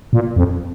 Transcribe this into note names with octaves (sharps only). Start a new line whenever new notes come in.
A#2
F2